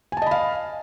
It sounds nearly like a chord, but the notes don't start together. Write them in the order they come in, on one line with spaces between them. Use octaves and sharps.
G#5 A5 D#5 B5 F5